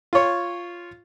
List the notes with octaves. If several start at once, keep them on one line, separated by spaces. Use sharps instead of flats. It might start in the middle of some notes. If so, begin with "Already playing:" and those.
F4 C#5